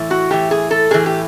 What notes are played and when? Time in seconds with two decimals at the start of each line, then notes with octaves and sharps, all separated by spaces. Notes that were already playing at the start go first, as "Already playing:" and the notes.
Already playing: A2 E3
0.11 F#4
0.31 A2 E3 G4
0.51 G#4
0.71 A4
0.91 A2 E3 G#4
1.06 G4